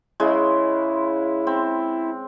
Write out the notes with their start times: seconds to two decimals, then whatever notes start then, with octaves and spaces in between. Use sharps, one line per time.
0.20 C#3 G#3 E4
1.47 C4